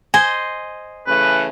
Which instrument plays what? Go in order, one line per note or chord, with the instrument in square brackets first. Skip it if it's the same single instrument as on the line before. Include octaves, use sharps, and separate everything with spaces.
[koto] C5 D#5 [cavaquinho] G#5
[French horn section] C#3 E3 A3 [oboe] B4